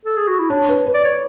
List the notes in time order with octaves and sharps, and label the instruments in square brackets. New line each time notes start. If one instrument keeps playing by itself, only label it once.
[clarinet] A4
G#4
F#4
E4
[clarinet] D4 [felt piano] C#5
[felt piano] B4
B4
[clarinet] D5
C#5